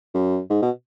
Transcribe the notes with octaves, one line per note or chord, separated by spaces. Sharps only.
F#2
G#2
B2